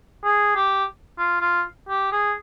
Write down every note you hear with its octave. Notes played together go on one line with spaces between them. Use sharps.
G#4
G4
F4
F4
G4
G#4